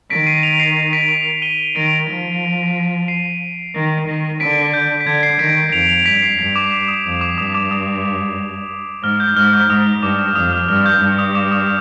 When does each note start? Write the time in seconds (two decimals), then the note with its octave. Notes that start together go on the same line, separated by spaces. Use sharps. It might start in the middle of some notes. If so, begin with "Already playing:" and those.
0.10 D#3 B6 D7
0.27 C7 D#7
0.43 D7 F7
0.60 C7 D#7
0.76 C7 D#7
0.93 B6 D7
1.09 D7 F7
1.42 D#7 G7
1.75 D#3 D7 F7
2.09 F3
3.08 C7 D#7
3.74 D#3
4.07 D#3
4.40 D3 B6 D7
4.74 G6
5.01 B6
5.06 D3 G#6
5.23 C7
5.39 D#3 B6 D7
5.72 F2 D7 F7
5.89 D7 F7
6.05 G2 B6 D7
6.22 C7
6.38 G2 B6
6.56 D6
6.72 D6
6.88 D#6
7.06 F2
7.21 D6
7.38 G2 D#6
7.55 D6
7.71 D#6
9.03 G#2 F6
9.20 G6
9.36 G#2 F6
9.53 G6
9.70 G#2 D#6
10.02 G2 D6
10.35 F2 D#6
10.52 F6
10.68 G2 F6
10.86 G6
11.01 G2
11.18 D#6
11.35 D6
11.52 D#6